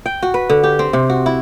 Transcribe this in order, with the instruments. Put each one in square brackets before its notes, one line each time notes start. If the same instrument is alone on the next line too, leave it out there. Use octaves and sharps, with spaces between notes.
[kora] G5
F#4
B4
D3
G4
C4
C3
F#4
E4